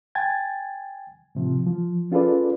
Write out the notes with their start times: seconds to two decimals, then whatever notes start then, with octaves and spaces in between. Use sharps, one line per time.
0.15 G5 G#5 G#6 A6
1.35 A2 C3 F3
1.67 F3
2.12 C#4 F4 G#4 A4 B4 D5